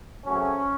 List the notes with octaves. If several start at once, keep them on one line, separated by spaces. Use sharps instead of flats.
F#2 C#3 F#3 A3 C4 C#4